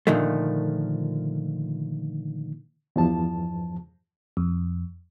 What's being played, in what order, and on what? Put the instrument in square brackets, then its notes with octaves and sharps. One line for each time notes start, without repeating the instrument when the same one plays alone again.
[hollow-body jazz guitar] A#2 D3 D#3 F3 A3
[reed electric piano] E2 G2 F3 A5
[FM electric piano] F2